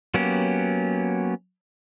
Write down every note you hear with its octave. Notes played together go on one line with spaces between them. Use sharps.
F#3 A#3 B3 C#4 G4